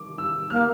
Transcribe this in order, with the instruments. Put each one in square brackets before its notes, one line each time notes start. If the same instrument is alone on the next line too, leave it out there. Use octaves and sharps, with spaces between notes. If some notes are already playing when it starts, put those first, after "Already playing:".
Already playing: [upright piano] D6
E6
[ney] A#3 [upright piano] F6